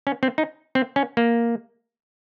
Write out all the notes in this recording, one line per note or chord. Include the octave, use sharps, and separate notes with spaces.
C#4
C4
D#4
C4
C#4
A#3